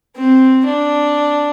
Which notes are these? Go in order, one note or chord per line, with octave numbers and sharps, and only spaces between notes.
C4
D4